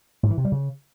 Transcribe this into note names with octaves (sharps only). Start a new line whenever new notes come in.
G#2
E3
C3
G3
C#3